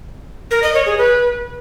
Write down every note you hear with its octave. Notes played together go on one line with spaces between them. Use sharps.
A#4
D#5
C#5
G#4
B4